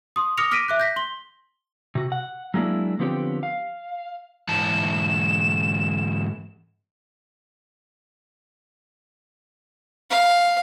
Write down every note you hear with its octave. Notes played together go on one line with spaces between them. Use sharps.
C6 D#6
D6 D#6 F6 A#6 C#7 F7
D6 F6 A#6 B6 D7 D#7
E5 D6 F#6
G6 A#6 B6
C6 G7
C3 F#4
F#5
F#3 G#3 A#3 D4 E4
D3 F3 B3 C4 G4 C#5
F5
G#2 E3 A5 E7
F5